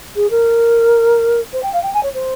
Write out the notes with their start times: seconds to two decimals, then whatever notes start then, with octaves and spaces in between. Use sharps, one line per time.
0.16 G#4
0.30 A#4
1.53 C5
1.63 G5
1.73 F5
1.83 G5
1.94 G#5
2.03 C#5
2.14 C5